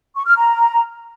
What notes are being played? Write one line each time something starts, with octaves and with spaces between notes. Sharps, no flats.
C#6
F6
A#5